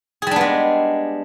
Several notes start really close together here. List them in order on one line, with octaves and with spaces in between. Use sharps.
G#4 G3 D4 B3 G#3